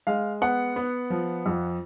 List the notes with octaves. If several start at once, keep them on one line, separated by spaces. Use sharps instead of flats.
G#3 F5
B3 F#5
B3
F3
F2